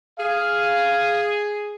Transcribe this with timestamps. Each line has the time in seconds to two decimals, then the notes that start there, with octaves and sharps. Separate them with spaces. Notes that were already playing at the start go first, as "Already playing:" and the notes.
0.18 G#4 F5